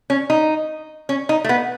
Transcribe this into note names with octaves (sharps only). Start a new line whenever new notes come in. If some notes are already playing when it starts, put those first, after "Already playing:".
C#4
D#4
C#4
D#4
A3
B3